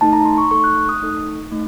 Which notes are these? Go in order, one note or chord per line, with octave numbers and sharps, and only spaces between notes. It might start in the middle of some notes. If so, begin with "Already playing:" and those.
A3 D#4 A4 A5
A#5
C6
C#6
A3 D#4 A4 C#6
F#6
F#6
D#6
A3 D#4 A4
A3 D#4